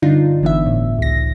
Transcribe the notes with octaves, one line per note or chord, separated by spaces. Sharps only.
G2 D3 D4 D#4 F4
G1 E3 B3 E5
A2
C#2 A#6